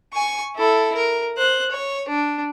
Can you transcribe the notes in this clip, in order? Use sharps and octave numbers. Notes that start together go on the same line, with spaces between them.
G#5 C#6
E4 A4
A#4
C5 F#6
C#5
D4